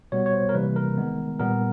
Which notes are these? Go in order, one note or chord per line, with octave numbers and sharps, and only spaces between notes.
B2 G3 B3 C#5
C#5
C5
A#4
C3 E3 G3 A#3 B4
A#4
D#3 G#3 B3
A#2 G3 B3 A#4